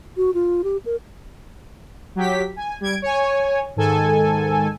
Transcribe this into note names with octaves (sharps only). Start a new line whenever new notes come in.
F#4
F4
G4
A#4
F#3 G4 B6
G#5
G3 G#6 D7
C#5 G#5
G#2 D#3 A4 G#5